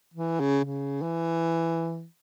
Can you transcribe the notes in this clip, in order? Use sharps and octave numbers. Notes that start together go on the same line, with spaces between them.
E3
C#3
C#3
E3